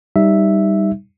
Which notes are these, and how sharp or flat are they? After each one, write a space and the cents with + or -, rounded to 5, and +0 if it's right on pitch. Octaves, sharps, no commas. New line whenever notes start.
G3 +0 D#4 +0 E5 +0